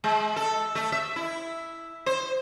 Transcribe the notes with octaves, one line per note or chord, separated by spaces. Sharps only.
G#3
A4
A3
E5
E4
C5